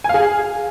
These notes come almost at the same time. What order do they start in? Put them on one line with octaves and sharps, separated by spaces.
G#5 F5 G#4